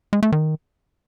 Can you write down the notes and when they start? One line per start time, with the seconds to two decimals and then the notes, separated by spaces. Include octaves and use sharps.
0.13 G#3
0.23 A3
0.32 D#3